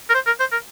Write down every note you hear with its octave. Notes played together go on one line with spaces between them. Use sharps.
A#4
C5
A#4
C5
A#4